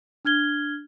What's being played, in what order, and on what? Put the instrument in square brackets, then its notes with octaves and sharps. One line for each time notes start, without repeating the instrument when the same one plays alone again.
[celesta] D4 F6 G#6 G7